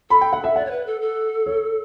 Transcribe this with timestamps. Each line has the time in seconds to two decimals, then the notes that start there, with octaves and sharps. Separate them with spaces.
0.10 A4 B5
0.21 G5
0.33 F#5
0.44 E5
0.56 D5 F#5
0.65 C#5
0.71 B4
0.86 A4
1.01 A4
1.46 C#5